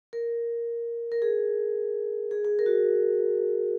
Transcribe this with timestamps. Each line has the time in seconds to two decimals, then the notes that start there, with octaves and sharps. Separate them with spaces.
0.13 A#4
1.12 A#4
1.22 G#4
2.31 G#4
2.45 G#4
2.59 A#4
2.66 F#4